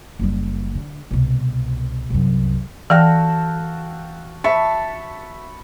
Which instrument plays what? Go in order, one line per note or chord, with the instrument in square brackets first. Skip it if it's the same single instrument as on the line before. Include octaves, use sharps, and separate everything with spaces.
[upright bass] F#1 G3
D3
C2 B2
C2 F#2
[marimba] E3 [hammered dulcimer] F#4 A4 [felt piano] F5 G5 F6
[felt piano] E5 [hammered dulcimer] A5 B5 C#6